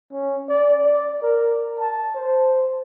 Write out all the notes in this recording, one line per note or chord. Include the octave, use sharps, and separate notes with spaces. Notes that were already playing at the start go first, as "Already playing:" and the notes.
C#4
D5
D5
A#4
A5
C5